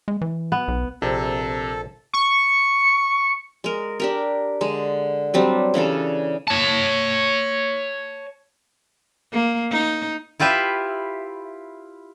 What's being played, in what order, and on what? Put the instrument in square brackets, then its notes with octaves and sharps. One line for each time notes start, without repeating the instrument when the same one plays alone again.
[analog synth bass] G#3
E3
[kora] B3
[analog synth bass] B1
[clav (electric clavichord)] A#1 C4 [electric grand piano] C3 [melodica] A4
[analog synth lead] C#6
[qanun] G#3 A#4
D4 G4 A#4
D3 G#3
F#3 G3 C4 D4
C#3 E3 D4 A4
[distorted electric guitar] C#5 A5
[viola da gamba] A#3
D#4
[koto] E4 F4 G4 B4 E5